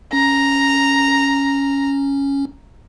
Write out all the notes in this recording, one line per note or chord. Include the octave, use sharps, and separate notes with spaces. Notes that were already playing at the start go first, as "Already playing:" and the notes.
C#4 A#5